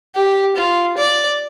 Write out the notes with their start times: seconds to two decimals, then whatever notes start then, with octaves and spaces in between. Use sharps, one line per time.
0.15 G4
0.56 F4
0.98 D5